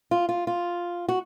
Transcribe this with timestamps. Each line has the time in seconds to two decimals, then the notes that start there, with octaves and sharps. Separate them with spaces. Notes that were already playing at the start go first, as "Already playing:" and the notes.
0.11 F4
0.29 F4
0.47 F4
1.09 F#4